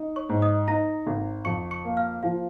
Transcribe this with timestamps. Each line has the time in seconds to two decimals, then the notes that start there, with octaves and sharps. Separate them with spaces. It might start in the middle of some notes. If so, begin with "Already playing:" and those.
Already playing: D#4
0.16 C#5 C#6
0.29 G#2
0.42 D#5 D#6
0.68 D#4 A#5 A#6
1.07 G#1
1.45 F2 C#6 C#7
1.71 C#6 C#7
1.85 A#3
1.97 F5 F6
2.23 F3 F5